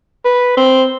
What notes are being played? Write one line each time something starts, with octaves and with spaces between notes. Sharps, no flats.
B4
C4